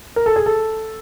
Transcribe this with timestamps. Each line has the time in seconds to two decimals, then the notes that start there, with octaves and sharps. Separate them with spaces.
0.16 A#4
0.26 A4
0.36 G#4
0.46 A4